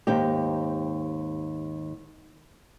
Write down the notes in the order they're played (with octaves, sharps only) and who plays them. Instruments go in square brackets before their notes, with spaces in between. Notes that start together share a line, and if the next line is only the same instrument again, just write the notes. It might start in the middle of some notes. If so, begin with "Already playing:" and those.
[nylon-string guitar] D#2 G#2 C4 D#4 G4